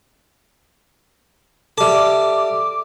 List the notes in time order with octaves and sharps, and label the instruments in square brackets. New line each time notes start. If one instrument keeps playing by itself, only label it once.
[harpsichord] G3 A5 [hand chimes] A4 E5 [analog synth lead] D6